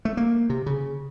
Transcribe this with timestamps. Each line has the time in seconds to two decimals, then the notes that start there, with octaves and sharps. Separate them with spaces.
0.05 A3
0.17 A#3
0.50 C3
0.66 C#3